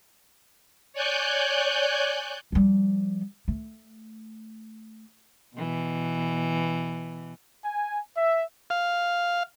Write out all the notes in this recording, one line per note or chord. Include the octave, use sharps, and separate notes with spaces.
C#5 D5 G#5 F#6 G6
F3 G3
A3
B2 E3
G#5
E5
F5